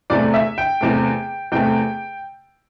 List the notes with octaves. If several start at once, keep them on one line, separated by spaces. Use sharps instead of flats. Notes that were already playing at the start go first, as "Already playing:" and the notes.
E2 C3 A3 D5
E5
G5
E2 C3 A3
E2 C3 A3 G5